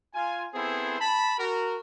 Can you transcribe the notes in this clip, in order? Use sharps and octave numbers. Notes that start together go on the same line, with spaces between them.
F4 G#5
B3 C4 E4 G#4 A4 C5
A5 B5
F#4 A#4